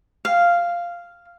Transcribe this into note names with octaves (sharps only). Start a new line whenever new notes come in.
F5